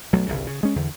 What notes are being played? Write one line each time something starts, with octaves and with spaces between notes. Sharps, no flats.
B1 F#3 A3
G1 C2 G2 C#3
C#3
G#3 C#4
E2 D3